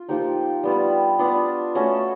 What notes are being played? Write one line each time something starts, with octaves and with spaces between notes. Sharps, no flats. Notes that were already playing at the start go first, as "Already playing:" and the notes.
Already playing: F4
F3 A#3 D#4 G4
G3 B3 D4 F4
B3 D4 F4
A3 C#4 F#4 A4